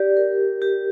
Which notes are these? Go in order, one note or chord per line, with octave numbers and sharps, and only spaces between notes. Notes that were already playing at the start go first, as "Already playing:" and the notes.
Already playing: G4 D5
A#4
G4